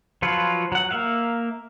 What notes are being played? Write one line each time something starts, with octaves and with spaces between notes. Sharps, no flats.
F3 F#3 F4 B4 C#5
F#3 F#5
A#3 E5 F5